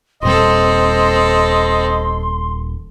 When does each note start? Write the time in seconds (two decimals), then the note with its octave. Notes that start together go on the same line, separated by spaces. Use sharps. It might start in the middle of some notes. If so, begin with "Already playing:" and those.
0.22 D#1 A#2 G3 C4 A4 D#5 C6